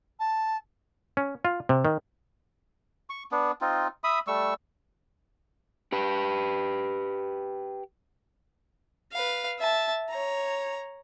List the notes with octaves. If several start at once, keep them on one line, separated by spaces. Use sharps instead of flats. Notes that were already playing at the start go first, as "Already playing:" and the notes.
A5
C#4
F4
C3
D#3
C#6
B3 D4
C4 D#4 F4
E5 B5 D#6
G3 A3 C#6 E6
G4 B4
B4 F5
E5 A5
C#5 A#5